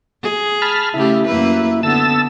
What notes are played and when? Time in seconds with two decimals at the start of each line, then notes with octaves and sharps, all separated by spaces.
0.23 G#4
0.62 A5 B5 F6
0.94 C#3 A3 E4 G4
1.27 F#2 A#3 B4
1.83 D3 B3 A5 E6